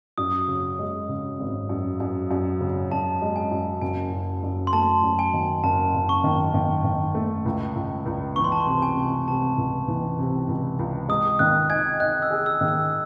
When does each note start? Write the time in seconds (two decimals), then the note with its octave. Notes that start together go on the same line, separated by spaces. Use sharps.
0.18 F#2 D#6
0.48 C#3
0.79 G#3
1.09 C#3
1.40 G#1
1.69 F#2
2.00 F#2
2.31 F#2
2.61 C#3
2.91 F#2 A5
3.22 G#3
3.36 G#5
3.52 F#2
3.81 F#1 G#5
4.13 F#2
4.43 F#2
4.67 C6
4.73 A3 A5
5.03 F#2
5.19 G#5
5.34 D#3
5.63 F#1 A5
5.94 F#1
6.09 C#6
6.24 D#3
6.54 D#3
6.84 D#3
7.15 A3
7.46 C#2
7.75 C#2
8.06 C#2
8.36 E3 C#6
8.44 C6
8.52 A5
8.60 C6
8.67 C3
8.82 G#5
8.97 C3
9.28 C3 A5
9.58 C#2
9.88 E3
10.19 C3
10.49 C#2
10.79 C#2
11.09 G#3 D#6
11.39 D#3 F#6
11.70 D#4 G#5 G#6
12.00 D#4 F#6
12.22 E6
12.31 G#4
12.46 E6
12.61 D#3
12.68 E6